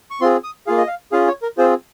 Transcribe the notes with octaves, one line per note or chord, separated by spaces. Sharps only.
C#6
C4 F4 G#4 C6
D#6
A#3 F4 G#4 F5
D#5
F5
C#4 F4 G#4 F5
C#5
A#4
C4 F4 G#4 C5